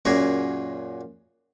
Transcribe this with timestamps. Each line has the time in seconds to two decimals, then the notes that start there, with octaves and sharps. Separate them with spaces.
0.05 F#2 A#2 F#4 G#4 A#5